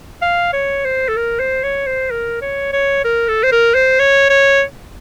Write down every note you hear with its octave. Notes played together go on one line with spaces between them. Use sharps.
F5
C#5
C5
A4
A#4
C5
C#5
C5
A#4
C#5
C#5
A#4
A4
C5
A#4
C5
C#5
C#5